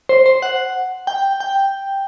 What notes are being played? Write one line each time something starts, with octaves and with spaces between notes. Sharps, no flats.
C5
C5
F#5
G5
G5